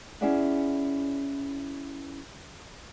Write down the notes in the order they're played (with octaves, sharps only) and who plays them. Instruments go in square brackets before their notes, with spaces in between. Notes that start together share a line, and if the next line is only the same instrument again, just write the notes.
[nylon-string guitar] C#4 E4 G#4 D5 E5 F#5